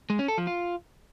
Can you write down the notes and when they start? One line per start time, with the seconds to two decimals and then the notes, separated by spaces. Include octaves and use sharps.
0.10 G#3
0.19 C#4
0.28 A4
0.38 F3
0.47 F4